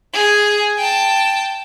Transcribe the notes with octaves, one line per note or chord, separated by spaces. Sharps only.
G#4
G5 A5